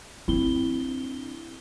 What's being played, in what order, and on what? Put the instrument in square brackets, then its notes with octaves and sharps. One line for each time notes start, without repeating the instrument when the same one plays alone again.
[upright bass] C4 D4 [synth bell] E4 G7